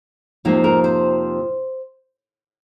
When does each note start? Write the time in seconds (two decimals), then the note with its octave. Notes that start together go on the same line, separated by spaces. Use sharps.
0.45 F2 C3 F3 A#3 D#4
0.64 A#4
0.84 C5